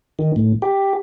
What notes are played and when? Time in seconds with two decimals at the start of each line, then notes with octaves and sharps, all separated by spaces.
0.19 D#3
0.36 A2
0.62 G4